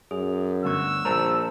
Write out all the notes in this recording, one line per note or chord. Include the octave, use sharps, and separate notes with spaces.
F#2 G#4
D2 G2 D3 B3 C#6 E6
A#1 A#4 C5 D5 A5 A#5